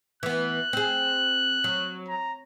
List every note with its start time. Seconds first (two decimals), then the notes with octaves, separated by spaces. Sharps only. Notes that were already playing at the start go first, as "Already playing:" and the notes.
0.23 E3 B3 F#6
0.73 C4 G#4
1.64 F#3
2.08 A#5